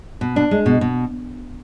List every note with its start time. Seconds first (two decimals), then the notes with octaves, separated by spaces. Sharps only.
0.21 B2
0.36 D4
0.51 G#3
0.66 B2
0.81 B2